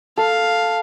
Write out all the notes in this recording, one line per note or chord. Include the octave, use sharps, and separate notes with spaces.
A4 F5